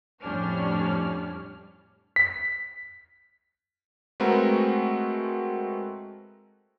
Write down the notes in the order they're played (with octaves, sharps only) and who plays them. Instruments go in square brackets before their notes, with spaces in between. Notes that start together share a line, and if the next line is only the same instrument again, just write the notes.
[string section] F2 A2 G3 C#4 D4 F6
[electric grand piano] B6
G#3 A3 C4 F#4 A#4 B4